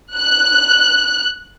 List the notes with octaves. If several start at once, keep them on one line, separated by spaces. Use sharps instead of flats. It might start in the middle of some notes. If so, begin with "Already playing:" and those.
F#6